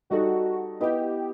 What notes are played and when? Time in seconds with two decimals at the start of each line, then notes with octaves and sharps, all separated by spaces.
0.10 G3 D#4 F#4 A4 D#5
0.80 B3 E4 G4 B4 D#5